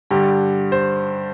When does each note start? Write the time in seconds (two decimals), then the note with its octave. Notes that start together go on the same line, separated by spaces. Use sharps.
0.11 G2 D3 G3 G4
0.72 C5